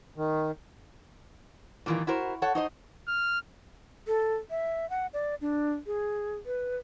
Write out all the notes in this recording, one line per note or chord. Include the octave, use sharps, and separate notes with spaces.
D#3
A#2 D#3 E3 G3 A#3
E4 F#4 A#4 C5
A4 C#5 F#5
D#4 C5 D#5
F6
A4
E5
F#5
D5
D4
G#4
B4